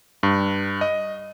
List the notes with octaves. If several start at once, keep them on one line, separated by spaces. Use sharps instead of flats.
G2
D#5